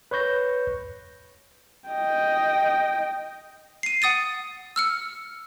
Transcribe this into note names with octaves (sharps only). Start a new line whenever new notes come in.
B4 C#5 C#6 G6 A#6
D#5 G5
C7 D#7
F#5 D#6 A6 D#7
E6 F6 C#7